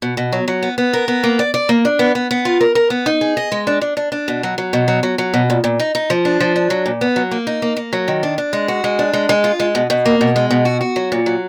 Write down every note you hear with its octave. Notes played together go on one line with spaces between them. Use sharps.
B2
B2
F#3
F#3
B3
B3
A#4
B3
A#3
D5
D5
A#3
D4
B3
B3
B3
F4
A#4
A#4
B3
D#4
G#4
D#5
G#3
D4
D4
D4
D4
B2
F#3
F#3
B2
F#3
F#3
F#3
B2
A#2
A#2
D#4
D#4
F3
D4
F3
D4
F#3
A#2
B3
F#3
A#3
D#4
A#3
A#3
F#3
D#3
D4
D4
G#3
F#4
G#3
D4
G#3
G#3
F4
G#3
B2
B2
A#3
B2
G#3
B2
F#4
F#4
F#3
A#2
F#3